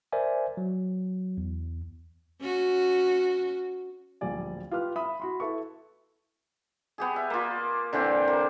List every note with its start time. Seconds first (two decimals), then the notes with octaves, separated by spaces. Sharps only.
0.12 A#4 C5 D5 E5 G#5
0.57 F#3
1.37 E2
2.40 C#4 F#4
4.21 D1 A#1 G3 D5 G#5
4.71 F4 G4 B4 F6
4.96 E5 B5 D#6
5.20 F#4 B5 C6
5.40 E4 A4 B4 C#6
6.98 B3 G4 G#4
7.16 E5
7.30 A#3 F4
7.93 D3 E3 C4 G5
8.28 A#3